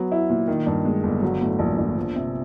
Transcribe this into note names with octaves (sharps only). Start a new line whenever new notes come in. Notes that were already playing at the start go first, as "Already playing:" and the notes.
Already playing: F#3 B3
E4
A#2
D#3
G2
G#3
G1
F#3
A2
A#1
A#1
F3
C3